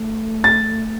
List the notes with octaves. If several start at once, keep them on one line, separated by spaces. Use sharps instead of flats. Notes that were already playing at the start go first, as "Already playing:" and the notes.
Already playing: A3
A6